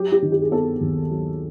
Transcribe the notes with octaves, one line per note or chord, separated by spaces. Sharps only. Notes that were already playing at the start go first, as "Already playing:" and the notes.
Already playing: F#3 G4
G4
D#3
G4
G#4
B3 A4
D#2
F#3